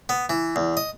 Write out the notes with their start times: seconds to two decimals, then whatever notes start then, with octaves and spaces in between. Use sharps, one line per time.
0.09 B3
0.29 E3
0.56 E2
0.77 D#5